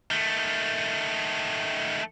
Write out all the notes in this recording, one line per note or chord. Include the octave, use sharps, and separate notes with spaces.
D#3 A3